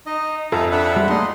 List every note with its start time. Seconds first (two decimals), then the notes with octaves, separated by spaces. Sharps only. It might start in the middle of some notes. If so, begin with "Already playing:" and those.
0.06 D#4 D#5
0.52 F2 A4 E5 F5 G#5 A#5
0.71 D4 E5 F#5 B5
0.96 G3 G#3
1.09 A3 A#3 D#4 D5 D#5 C6